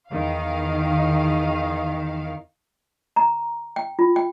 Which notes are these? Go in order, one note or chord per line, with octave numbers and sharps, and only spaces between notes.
E2 D#3 F5
A#5
G5
F4
G5